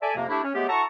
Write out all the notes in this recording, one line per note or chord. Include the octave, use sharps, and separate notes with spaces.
A4 D5 E5 G#5
F2 C3 A#3
A3 D4 E4 G4
C#4
F#3 G#3 A3 B3 G4
E4 F#4 A4 A5 A#5 C#6